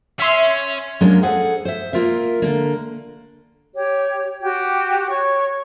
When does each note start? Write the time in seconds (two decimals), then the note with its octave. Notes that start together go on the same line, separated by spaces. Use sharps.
0.19 C#4 E5 C6
1.01 F#3 G#3 A#3 C#4 D4
1.23 G#4 A4 C5 F#5
1.65 C5 E5
1.93 A#3 F4 A#4 E5
2.42 D3 A#3
3.73 G4 C#5
4.40 F#4 G4
5.08 C#5 C#6